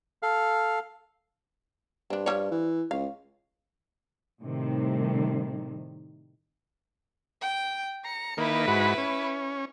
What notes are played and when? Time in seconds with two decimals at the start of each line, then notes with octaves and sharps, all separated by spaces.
0.23 A4 F5 F6
2.10 G2 C4 D4
2.26 F3 G3 C#5
2.51 E3
2.91 C#2 F5
4.41 A2 C3 D#3 G3
7.41 G5
8.05 A#5 C#7
8.37 D#3 A#3 E4 B4
8.68 G#2 F#4 B5
8.98 C#4